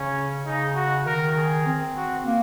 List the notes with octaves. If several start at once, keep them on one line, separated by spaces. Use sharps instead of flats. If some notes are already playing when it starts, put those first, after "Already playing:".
Already playing: C#3 C#4
C#3 D#4
F#4
D#3 A#4
G#4
C4
F#4
A#3